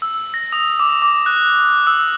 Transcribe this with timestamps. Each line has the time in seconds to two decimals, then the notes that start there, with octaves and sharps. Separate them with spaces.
0.02 E6
0.34 A#6
0.52 D#6
0.80 D6
1.02 D6
1.26 F#6
1.87 E6